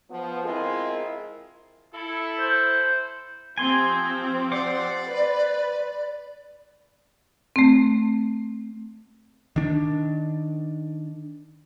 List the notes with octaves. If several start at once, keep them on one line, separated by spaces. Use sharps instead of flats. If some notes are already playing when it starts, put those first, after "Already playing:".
F3 B3
G#3 C4 E4 F4 G#4 A#4
E4 A4
C5
F3 C4 G4 G#5 C6
C5 D5 F#5 D6
B4
A3 C4
D#3 D4